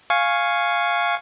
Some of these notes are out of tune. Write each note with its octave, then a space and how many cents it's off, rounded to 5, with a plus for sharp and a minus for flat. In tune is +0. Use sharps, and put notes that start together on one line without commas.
F5 +0 G#5 +0 C#6 -5